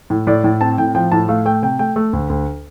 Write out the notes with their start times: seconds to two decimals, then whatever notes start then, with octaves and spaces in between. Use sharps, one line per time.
0.10 A2
0.27 A2 D5
0.44 A2
0.61 C4 A5
0.78 A2 G5
0.95 F3 G5
1.12 A2 A5
1.29 A3 F5
1.46 A3 G5
1.62 C3 G5
1.79 A3 G5
1.96 A3
2.13 D2
2.30 D2